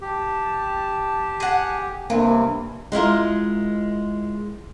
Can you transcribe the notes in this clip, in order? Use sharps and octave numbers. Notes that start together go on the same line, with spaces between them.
G4 A5
G#4 F#5
G2 C3 E3 A#3
G#3 E4 F4 A#4